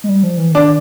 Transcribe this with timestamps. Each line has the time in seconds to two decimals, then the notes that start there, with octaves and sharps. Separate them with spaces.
0.04 G#3
0.09 G3
0.23 F3
0.37 E3
0.52 D#3 D4